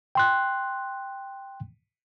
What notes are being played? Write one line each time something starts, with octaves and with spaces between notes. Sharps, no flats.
G5 C6 F#6